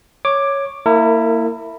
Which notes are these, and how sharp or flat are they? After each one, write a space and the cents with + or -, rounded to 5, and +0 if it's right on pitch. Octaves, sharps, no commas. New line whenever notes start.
C#5 +0 D6 +10
A#3 -20 E4 +0 A#4 -40